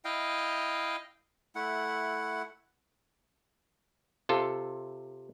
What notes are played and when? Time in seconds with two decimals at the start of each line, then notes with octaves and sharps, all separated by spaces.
0.05 E4 D#5 F5 G5
1.55 A3 E4 F#5
4.29 C3 F4 A4